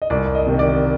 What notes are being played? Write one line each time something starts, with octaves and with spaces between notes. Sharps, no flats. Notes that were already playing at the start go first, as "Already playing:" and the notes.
D#5
C2 D5
D#5
C3 D#3
D5